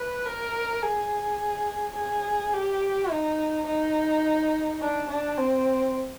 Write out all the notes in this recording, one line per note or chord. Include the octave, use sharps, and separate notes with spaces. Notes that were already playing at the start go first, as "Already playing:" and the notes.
Already playing: B4
A#4
G#4
G#4
G4
D#4
D#4
D4
D4
C4